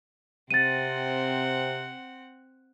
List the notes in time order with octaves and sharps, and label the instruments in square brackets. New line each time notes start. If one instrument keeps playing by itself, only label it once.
[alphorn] C3 [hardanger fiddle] C4 F#5 [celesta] A6 D#7